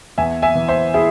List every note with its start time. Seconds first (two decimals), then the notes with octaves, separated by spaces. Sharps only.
0.18 E2 E5 G#5
0.42 E5 G#5
0.55 E3
0.68 C5 E5
0.94 E4 G#4